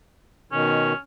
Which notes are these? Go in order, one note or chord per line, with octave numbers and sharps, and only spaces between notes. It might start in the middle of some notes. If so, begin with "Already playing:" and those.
B2 D#3 C#4